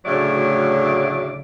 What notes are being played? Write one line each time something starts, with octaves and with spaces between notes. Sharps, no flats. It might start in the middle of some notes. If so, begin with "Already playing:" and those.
D2 A2 C#3 F#3 D5 E5